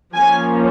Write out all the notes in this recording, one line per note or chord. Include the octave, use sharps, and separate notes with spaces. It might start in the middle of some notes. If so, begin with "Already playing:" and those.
F3 A#3 C#4 G#5